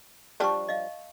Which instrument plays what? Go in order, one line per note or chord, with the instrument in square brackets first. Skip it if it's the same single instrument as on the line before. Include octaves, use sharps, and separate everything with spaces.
[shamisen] F3 G3 D4 [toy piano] A5 C#6
[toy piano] D#5 F5